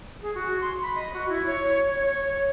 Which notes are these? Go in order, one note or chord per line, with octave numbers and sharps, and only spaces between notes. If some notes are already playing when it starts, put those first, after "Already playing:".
G#4
F#4
C6
B5
D#5
F#4
E4
C#5
C#5
C#5
C#5